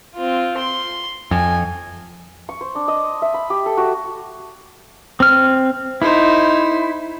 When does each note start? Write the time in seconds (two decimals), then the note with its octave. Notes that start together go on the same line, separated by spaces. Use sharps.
0.15 C4 F4
0.57 C6
1.31 F2 G#5
2.49 C#6
2.61 C5
2.75 D4
2.88 D#5
3.22 E5
3.34 B5
3.50 G4
3.66 A4
3.77 F#4
5.20 C4 F6
6.02 D#4 E4 C5